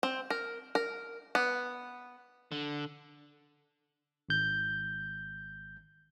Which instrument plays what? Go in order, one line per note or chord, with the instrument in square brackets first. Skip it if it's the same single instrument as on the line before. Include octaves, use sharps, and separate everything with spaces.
[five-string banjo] C4
A#4
A#4
B3
[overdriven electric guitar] D3
[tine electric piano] G#1 G6